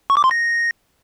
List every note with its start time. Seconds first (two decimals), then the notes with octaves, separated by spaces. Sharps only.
0.10 C#6
0.17 D6
0.24 C6
0.31 A#6